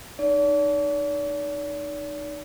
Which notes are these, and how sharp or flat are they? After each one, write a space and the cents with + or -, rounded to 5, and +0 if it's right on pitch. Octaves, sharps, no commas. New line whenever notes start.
D#4 -25 D5 -45